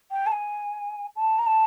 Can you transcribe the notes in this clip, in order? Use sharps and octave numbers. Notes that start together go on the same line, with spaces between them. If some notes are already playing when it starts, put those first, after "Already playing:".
G5
A5
G#5
A5
A#5
A5